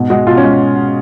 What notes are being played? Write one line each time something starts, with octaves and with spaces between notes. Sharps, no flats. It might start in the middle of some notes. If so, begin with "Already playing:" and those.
Already playing: G#2 B2
G#3 F#4
B2 F4
C#4
G#3